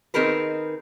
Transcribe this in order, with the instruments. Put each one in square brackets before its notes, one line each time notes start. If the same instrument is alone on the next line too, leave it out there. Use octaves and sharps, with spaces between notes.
[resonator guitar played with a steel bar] D#3 C4 D#4 G#4 A#4 B4